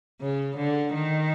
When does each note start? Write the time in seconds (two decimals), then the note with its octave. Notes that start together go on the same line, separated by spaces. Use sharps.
0.21 C#3
0.57 D3
0.94 D#3